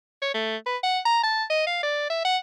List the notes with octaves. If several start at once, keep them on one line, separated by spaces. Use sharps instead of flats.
C#5
A3
B4
F#5
A#5
A5
D#5
F5
D5
E5
F#5